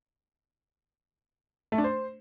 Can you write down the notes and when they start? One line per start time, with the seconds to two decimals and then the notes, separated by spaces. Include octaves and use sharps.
1.72 A3
1.78 D4
1.84 C5